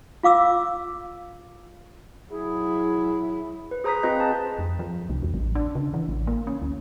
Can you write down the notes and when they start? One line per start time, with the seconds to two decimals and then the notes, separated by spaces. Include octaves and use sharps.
0.23 F4 F5 D6 E6
2.31 F#3 E4 G#4
3.71 B4
3.84 G#4 C5 A#5 D#6 G6 B6
4.03 C4 F4 G#4 B4 D#5 G6
4.20 A5
4.59 F2
4.79 F3
5.09 C2
5.22 E2
5.34 A1
5.55 D4
5.75 C#3
5.94 E3
6.08 A1
6.27 A#3
6.47 C#4
6.62 D2